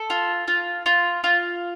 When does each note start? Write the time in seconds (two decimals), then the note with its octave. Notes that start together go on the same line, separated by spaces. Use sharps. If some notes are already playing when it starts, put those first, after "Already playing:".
Already playing: A4
0.10 F4
0.48 F4
0.86 F4
1.24 F4